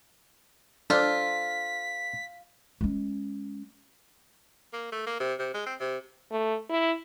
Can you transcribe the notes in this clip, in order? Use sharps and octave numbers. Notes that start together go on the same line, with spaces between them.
D4 F4 A4 C5 B6
G#3 C#4
A#3
A3
A#3
C3
C3
G#3
C4
C3
A3
E4